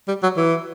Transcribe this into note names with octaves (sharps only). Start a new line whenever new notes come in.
G3
F#3
E3